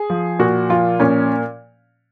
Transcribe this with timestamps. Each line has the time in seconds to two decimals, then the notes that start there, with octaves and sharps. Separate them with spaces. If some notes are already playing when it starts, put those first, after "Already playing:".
Already playing: G#4
0.10 F3
0.39 A#2 F#4
0.69 F3 F4
1.00 A#2 C#4